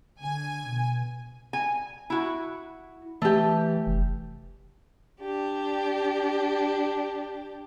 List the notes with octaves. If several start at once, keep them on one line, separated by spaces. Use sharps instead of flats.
D3 G#5
B2
G#5
E4 F#4
E3 A3 G4
F1
D4 G4